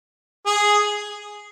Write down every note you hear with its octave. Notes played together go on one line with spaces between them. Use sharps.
G#4